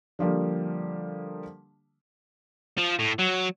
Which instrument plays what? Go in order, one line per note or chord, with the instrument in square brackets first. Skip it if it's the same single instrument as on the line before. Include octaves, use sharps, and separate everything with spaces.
[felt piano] D3 F3 G3 A#3
[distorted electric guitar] F3
A2
F#3